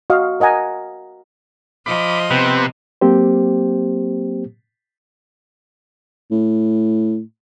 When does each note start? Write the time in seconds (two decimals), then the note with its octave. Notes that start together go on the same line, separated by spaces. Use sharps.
0.10 F#4 D#5 F5
0.40 A#4 D#5 F#5 G#5 A#5
1.86 F3 D#5 B5 D6
2.31 C3 B3 C4 B4
3.01 F#3 A#3 C4 G4 C5
6.31 A2